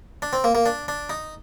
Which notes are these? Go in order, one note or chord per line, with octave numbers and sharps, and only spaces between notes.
D4
C4
A#3
A#3
D4
D4
D#4